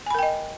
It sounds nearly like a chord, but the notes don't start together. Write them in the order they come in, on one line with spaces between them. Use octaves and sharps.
G#5 B5 A#4 G5 D#5